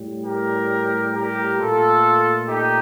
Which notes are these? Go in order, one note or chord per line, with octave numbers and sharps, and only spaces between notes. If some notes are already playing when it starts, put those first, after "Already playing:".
Already playing: A2 G3
G4 A#4
G4 A#4
A#2 A3 F4 A4
D#4 G4